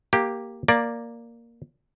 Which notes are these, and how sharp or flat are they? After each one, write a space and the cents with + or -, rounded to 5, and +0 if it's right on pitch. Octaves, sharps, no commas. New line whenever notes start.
A#3 +0 G4 +0
A#3 +0 D5 +0